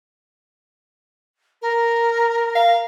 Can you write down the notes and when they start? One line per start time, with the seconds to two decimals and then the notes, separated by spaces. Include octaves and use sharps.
1.62 A#4
2.55 F5